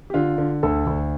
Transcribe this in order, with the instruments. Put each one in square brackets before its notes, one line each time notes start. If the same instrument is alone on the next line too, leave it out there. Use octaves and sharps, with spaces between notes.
[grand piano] G4
D3 F4
D3
D2 A4
D2